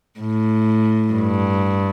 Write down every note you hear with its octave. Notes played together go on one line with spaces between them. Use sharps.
A2
G2